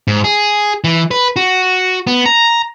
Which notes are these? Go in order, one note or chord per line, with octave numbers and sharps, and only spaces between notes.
G#2
G#4
E3
B4
F#4
B3
A#5